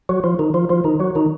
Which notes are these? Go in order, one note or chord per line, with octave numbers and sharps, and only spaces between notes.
F#3 F#4
F3 F4
D#3 D#4
F3 F4
F3 F4
D#3 D#4
F#3 F#4
D#3 D#4